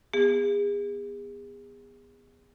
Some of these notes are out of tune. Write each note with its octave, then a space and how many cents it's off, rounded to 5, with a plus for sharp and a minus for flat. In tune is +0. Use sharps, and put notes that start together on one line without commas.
B3 +0 G#4 -35